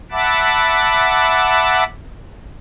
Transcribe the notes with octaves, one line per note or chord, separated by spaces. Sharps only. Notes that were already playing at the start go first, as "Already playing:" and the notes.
E5 F#5 A5 B5 D6